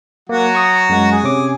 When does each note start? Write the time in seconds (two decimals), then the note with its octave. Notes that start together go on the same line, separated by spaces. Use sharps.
0.29 F#3 A#3 F#4
0.55 C#6 D#6
0.89 F#2 G#3 F#5
1.11 G#4
1.23 C3 C#4 D6